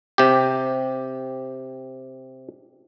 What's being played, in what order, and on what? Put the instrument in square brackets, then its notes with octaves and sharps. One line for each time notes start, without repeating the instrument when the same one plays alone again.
[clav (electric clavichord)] C3 G4